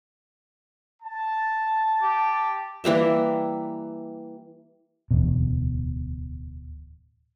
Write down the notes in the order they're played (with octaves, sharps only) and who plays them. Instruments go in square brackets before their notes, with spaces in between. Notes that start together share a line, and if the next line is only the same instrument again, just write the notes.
[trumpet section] A5
[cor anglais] G4
[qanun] E3 G3 A#3 E5
[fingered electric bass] D1 E2 B2